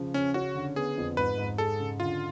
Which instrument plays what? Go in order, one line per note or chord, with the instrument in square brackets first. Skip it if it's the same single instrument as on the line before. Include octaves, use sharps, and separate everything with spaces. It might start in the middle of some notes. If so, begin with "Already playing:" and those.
Already playing: [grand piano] C#3 F3
[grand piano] C#3 [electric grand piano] C#4
[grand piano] C#4 [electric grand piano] F#4
[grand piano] D3
[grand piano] B3 [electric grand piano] G#4
[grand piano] F2
[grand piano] G#2 [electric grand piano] B4
[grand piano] G#2
[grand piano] G#4 [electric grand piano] A4
[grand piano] C#3
[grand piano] D3 [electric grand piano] F4